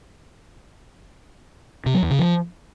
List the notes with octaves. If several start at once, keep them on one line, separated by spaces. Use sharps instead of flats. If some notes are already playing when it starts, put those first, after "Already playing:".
C3
F#3
E2
C#3
F3